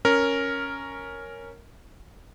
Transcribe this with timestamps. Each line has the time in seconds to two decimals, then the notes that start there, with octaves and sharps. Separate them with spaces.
0.05 C#4 A#4